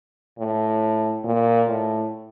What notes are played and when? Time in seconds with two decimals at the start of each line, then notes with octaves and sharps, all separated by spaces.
0.38 A2
1.24 A#2
1.68 A2